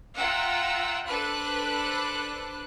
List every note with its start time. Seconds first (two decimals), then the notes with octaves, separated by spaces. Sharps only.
0.17 F4 E5 F#5 G5 A#5 E6
1.07 D4 A4 B4 C5 B5 F#6